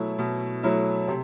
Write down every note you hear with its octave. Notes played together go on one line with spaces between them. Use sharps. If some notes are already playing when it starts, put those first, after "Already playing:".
Already playing: B2 F#3 A3 E4
B2
F#3 A3 E4
C3